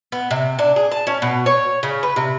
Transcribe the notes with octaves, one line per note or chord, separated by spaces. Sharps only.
B3
C3
D4
G#4
A5
C#4
B2
C#5
C#3
B4
C3